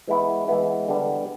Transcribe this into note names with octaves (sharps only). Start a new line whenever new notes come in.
E3 G#3 B3 E4
E3 G#3 B3 E4
D3 G3 B3 D4